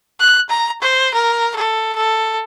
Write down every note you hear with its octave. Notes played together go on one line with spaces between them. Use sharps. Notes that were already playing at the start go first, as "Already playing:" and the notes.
F#6
A#5
C5
A#4
A4
A4